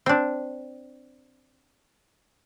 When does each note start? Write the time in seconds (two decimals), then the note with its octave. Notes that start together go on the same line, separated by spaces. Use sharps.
0.06 C4 D4